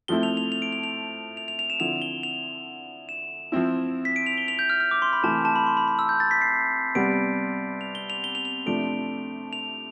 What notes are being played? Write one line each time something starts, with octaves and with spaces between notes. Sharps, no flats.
F3 A3 C4 E4 G7
F7
F7
F7
D7
F7
F7
F7
F7
F7
E7
D3 F3 C4 E4 F7
G7
F7
E7
F3 C4 E4
B6
D7
F7
G7
F7
G6
F6
F6
D6
C6
B5
C3 E3 A3 E4 A5
A5
B5
C6
B5
B5
E6
G6
A6
B6
C7
C3 G3 B3 D7
F7
G7
F7
G7
F7
F7
C3 F3 A3 D4 D7
F7